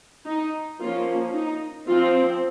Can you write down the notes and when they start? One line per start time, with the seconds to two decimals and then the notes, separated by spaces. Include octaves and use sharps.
0.26 D#4
0.79 F3 A#3 C#4 F4
1.33 D#4
1.87 F3 C4 F4